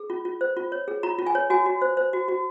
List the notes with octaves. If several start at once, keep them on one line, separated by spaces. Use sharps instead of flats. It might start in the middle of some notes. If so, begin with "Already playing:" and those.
Already playing: G#4
F4
F4
C5
F4
C#5
G#4
F4 A#5
F4
G#5
C#5
F#4 G#5
F#4
C5
C5
F#4
F#4